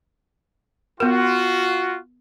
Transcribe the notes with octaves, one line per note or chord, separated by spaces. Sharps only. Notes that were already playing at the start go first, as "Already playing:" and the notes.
B3 F4 F#4 A#4